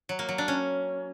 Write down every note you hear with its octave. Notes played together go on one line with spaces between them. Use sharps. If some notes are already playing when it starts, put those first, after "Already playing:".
F#3
A#3
F#3
D4
C#4